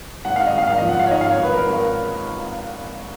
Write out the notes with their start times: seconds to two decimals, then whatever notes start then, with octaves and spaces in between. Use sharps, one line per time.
0.25 G#1 F#5
0.36 G#1 F5
0.47 D#5
0.53 G#1 F5
0.67 G#1 F5
0.78 F3 D#5
0.89 F#5
0.97 G#1 F5
1.07 C#5
1.11 G#2 D#5
1.21 G#1 F5
1.31 C#5
1.39 G#1 B4
1.53 G#1 A#4
1.67 G#1
1.74 A#4